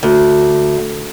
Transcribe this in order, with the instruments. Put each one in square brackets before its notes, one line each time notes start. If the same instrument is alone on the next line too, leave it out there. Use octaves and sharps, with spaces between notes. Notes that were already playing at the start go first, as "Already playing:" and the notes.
[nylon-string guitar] D2